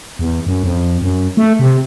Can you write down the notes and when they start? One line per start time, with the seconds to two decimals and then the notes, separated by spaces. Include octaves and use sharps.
0.19 E2
0.46 F#2
0.63 F2
1.02 F#2
1.37 A3
1.59 C3